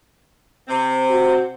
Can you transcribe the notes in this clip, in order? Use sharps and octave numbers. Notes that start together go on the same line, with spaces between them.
C3 C4
F#4